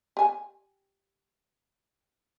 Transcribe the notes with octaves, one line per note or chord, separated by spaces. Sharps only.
G4 G#5